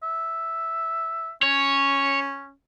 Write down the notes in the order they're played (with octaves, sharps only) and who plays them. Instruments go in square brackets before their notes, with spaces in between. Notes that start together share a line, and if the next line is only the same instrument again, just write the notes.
[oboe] E5
[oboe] C#4 [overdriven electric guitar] C#5